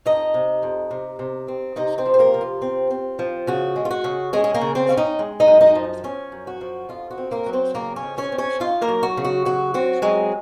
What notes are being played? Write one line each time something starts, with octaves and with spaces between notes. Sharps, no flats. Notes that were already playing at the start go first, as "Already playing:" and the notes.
F2 D#4 D#5
C3
F2
C3
C3
C4
C3 D#4 D#5
C4 C5
F3
C5
A#3 A#4
C3
F4
C4
C4
F3
C#3 F#4
G#3
F4
F#4
C#3
G#3 C#4 G#4
G#4
A#3 A#4
C#3
C4 C5
C#4 F5
D#4 D#5
G#3
D#4 D#5
F#2
D#4 D#5
F3
F3 C#4 C#5
F#2
F#4
F3
F2 F4
F#4
C4
A#3 A#4
F#3
C4 C5
C#3 A#3 A#4
C#4 C#5
F2
C#4 C#5
C4
C#4 C#5
D#4 F4 F5
A#3 A#4
F#3
F#4
C#3
F#4
F#3 F#4
C4 F#4
F#3 G#3 G#4